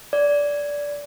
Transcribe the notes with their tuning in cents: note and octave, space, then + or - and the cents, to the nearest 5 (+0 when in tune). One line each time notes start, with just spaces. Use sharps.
D5 -15